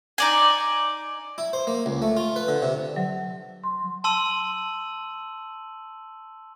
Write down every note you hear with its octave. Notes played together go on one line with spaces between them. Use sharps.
D#4 D5 G#5
E4
C5
A#3
C#2
A3
F4
B4
D3
C3
F#3
C6
A5 C6 E6 D#7 F#7